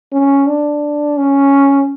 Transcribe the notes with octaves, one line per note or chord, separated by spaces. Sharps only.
C#4
D4
C#4